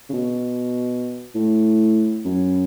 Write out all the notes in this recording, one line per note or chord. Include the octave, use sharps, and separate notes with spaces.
C#3
B2
A2
F#2